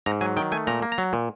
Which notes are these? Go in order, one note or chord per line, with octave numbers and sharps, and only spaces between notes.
G#2 A#5
F#3 G#5
D#3 G5
A3 G#5
A#2 A#5
A#3
A#5
F#3
A#2